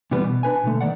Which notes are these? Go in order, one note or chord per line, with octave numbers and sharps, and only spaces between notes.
C3 E3 G3 B3
B2
D4 B4 G#5
B2 D3 A3
D#3 A3 D5 F#5